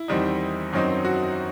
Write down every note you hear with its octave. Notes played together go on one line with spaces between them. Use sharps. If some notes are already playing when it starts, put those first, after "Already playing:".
Already playing: E4
E2 D#3 G3 C4 D#4
F#2 D#3 F#3 C4 D#4
F#4